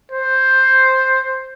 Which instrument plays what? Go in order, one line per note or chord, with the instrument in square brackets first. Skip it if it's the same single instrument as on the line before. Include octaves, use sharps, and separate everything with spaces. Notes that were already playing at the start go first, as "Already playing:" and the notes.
[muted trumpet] C5